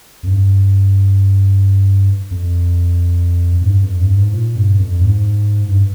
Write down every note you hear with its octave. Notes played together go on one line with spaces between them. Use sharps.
F2
G2
F2
G#2
G2
F2
G2
G#2
A#2
G2
F2
G#2
G2